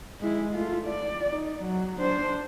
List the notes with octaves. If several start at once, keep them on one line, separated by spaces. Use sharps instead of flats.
G#3 E4
A3 F4
D5
D#4
F#3
D4 C5